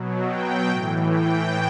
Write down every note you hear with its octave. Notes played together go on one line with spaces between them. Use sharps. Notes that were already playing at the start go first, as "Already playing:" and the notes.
Already playing: B2 F#3
G5
A2 E3
G5